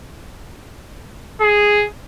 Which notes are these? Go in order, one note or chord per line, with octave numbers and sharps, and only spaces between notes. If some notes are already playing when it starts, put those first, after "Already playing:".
G#4